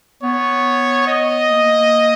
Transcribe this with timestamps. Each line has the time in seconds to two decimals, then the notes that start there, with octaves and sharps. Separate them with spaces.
0.23 B3 C#5
1.07 D#5
1.50 A#3